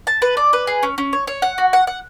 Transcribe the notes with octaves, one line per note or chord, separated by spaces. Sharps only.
A5
B4
D5
B4
G#4
C#4
C#4
C#5
C#5
F#5
F#4
F#5
F#5